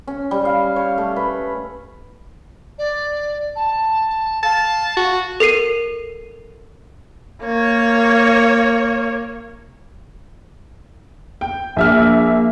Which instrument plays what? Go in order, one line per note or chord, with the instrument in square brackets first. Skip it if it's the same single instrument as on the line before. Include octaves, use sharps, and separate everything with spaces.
[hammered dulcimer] C#4
G3
F5
C#5
A3
B4
[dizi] D5
A5
[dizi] F5 [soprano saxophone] A5
[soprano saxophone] F#4
[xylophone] A4 A#4 C7 D#7
[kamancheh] A#3 C#5
[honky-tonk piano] G5
[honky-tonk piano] A#1 E5 F6 [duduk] A#3